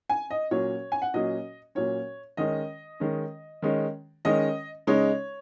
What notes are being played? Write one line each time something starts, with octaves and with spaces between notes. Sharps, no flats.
G#5
D#5
A#2 F#3 C#4 C#5
G#5
F#5
A#2 F#3 C#4 D#5
A#2 F#3 C#4 C#5
D#3 G#3 C#4 D#5
D#3 G#3 C#4
D#3 G#3 C#4
D#3 G#3 C#4 D#5
C#3 G#3 D#4 C#5